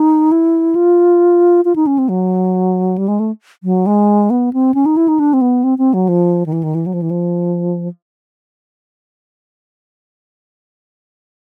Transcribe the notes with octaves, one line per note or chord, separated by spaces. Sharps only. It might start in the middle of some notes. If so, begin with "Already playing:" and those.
Already playing: D#4
E4
F4
F4
D#4
C#4
C4
F#3
G3
G#3
A3
F#3
G#3
B3
C4
C#4
D#4
E4
D#4
D4
C4
B3
C4
C4
F#3
F3
D#3
E3
D#3
E3
F#3
F3
E3
F3